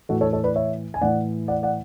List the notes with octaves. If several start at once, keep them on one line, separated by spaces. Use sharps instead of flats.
A2 E3 F#4 A4
A4 C#5
A4 C#5
B4 D5
C#5 E5
G#5
A2 E3 D5 F#5
D5 F#5
D5 F#5